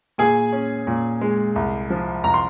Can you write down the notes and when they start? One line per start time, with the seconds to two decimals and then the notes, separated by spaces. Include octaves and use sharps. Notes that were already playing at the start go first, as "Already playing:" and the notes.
0.18 A#2 G#4 G#5
0.52 C#4
0.87 A#2
1.21 G#3
1.56 C2
1.90 F3
2.24 C2 A#5
2.34 C6